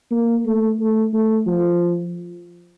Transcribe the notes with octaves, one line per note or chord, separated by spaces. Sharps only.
A#3
A3
A3
A3
F3